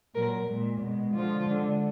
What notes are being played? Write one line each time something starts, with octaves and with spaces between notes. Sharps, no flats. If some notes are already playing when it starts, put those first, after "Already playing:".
A#2 F#3 A#4
A#2 G#3
B2 G#3
D3 F3 G#3 F4
D3 G#3